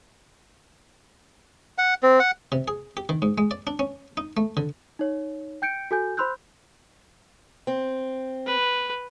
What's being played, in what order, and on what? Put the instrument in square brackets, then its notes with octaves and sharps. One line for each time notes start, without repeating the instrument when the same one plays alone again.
[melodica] F#5
C4
F#5
[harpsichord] C3
G#4
G4
D#3
G#2
G#3
D5
D4
C#4
D#4
A3
D3
[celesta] D#4 C#5
G5 G6 C#7 D7
F#4 A4 G#5 G6
C5 B5 C6 E6 F#6 G6
[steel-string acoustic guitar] C4
[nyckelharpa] B4